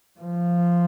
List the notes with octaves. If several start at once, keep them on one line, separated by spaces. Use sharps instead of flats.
F3